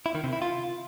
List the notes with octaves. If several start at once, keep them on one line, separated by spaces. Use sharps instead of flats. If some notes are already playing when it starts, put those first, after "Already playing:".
E4
D#3
C3
E4
F4